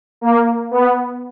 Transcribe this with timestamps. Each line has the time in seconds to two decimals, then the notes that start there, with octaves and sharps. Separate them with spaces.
0.21 A#3
0.71 B3